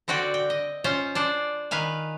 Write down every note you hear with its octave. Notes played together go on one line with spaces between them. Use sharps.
D3 C4 F#4 D5 G5
G5
D#5
C#4 F4 C5
D4 C5 D5
D#3 B4 F5 G#5